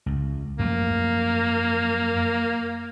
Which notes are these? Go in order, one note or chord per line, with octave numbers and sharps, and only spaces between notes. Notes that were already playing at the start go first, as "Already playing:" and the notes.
C#2
F#2 F3 A3 A#3